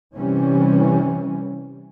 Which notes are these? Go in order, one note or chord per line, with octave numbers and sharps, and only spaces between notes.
C3 E3 G3 C#4